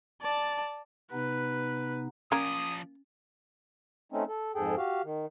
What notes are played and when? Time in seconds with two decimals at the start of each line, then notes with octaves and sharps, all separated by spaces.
0.22 D5 A5
1.12 C3 B3 D#4 B4
2.32 F3 A#3 C#4 D5 A#5 D#6
4.12 A3 C4 C#4 D#4
4.28 A4
4.55 F2 G#2 G#4 A4 G5
4.77 F#4 G4 F5
5.04 D#3